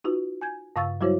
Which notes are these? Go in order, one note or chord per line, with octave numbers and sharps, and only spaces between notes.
D#4 F4 F#4 B4
G#5 G6 G#6
G2 C#3 F5 C#6 E6 A6
F#3 G3 E4 F#4 C5 C#5